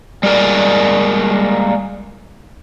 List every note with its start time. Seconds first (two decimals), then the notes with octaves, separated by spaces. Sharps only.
0.23 G3 G#3 A#3 A#4 D5